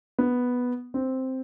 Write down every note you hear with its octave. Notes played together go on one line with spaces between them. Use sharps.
B3
C4